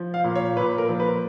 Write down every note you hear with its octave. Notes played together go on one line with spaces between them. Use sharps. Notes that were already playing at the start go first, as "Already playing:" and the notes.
Already playing: F3
F5
A#2
C#5
A#2 B4
A#4
F3
B4